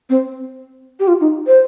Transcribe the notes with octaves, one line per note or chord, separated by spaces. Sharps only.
C4
G4
F4
D#4
C5